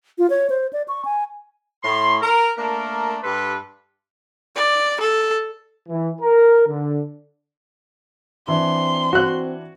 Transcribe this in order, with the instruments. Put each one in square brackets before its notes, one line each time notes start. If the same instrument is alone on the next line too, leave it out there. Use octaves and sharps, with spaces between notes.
[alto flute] F4
C#5
C5
D5
C#6
G#5
[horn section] A2 C6
A#4
A3 A#3 D4 A#4
G2 G4 A4 B4 C6
[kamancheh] D5
A4
[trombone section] E3
A#4
D3
[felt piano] E3 D4 [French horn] C4 [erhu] C6
[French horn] C4 [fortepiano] F#4 F#6